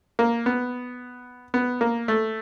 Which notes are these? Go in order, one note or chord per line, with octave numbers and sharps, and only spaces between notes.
A#3
B3
B3
A#3
A3